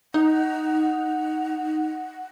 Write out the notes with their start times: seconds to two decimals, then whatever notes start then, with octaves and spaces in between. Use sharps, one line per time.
0.14 D#4 F#5